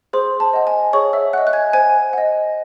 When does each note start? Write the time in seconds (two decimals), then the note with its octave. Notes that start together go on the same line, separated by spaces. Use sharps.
0.13 G#4 C5 C6
0.40 A5
0.53 D#5 F#5
0.67 G#5
0.93 G#4 C#5 C#6
1.13 E5 E6
1.33 D#5 F#5 F#6
1.47 F#6
1.53 G#5 G#6
1.73 C5 G#5 G#6
2.13 D#5 F#5